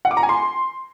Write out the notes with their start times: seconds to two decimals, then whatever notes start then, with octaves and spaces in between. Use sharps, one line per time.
0.05 F#5
0.11 D6
0.17 A#5
0.23 G#5
0.29 C6